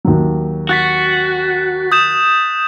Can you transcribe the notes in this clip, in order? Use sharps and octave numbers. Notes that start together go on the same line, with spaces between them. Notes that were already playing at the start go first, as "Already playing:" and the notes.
D#2 F#3
F#4 F#6 A6 B6
D#6 G6 E7